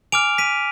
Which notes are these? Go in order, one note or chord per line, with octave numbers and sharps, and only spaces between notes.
G#5 D6 F6 D7 F7
B6 D#7